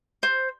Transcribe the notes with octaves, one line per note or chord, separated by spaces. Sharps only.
C5